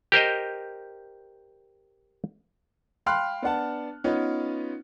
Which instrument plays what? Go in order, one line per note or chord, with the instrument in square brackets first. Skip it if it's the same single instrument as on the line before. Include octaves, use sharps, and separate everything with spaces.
[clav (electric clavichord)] G4 A#4 C5 D#5
[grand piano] F5 G5 B5 C6 F6 F#6
B3 D4 F#5 A5
B3 C#4 D#4 F4 B4 C#5